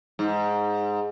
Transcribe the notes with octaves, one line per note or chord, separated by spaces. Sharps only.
G#2